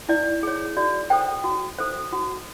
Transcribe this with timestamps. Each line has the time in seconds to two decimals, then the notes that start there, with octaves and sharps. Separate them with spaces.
0.09 E4 D5
0.43 G#4 C#5
0.77 F#4 D5
1.10 A4 C5 G5
1.44 F#4
1.78 A4 C5
2.12 F#4